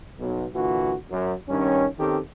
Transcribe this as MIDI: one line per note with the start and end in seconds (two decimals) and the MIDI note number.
0.19 0.46 35
0.55 0.95 46
0.55 0.95 50
0.55 0.95 52
0.55 0.95 66
1.10 1.34 42
1.49 1.87 43
1.49 1.87 51
1.49 1.87 61
1.99 2.19 51
1.99 2.19 60
1.99 2.19 61
1.99 2.19 67
1.99 2.19 69